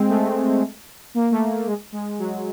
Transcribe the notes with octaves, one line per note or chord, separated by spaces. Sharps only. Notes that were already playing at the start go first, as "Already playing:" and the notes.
Already playing: G#3 C4
A3
A#3
A3
A3
G#3
G#3
F#3